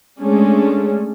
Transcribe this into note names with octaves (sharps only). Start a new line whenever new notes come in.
G#3 A3 C#4 D4